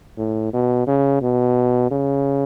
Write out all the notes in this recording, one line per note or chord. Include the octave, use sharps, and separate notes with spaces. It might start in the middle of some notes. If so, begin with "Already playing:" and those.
A2
B2
C#3
B2
C#3